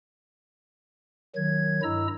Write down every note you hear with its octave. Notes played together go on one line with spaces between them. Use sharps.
D#3 F#3 G#6
G2 E4 D#5 A#5 E6